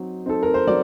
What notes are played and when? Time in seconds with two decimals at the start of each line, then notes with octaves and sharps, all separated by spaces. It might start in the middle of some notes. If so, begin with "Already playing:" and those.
Already playing: F#3 C4 D#4
0.26 C4 D#4 A4
0.43 A#4
0.54 C5
0.67 F#3 D5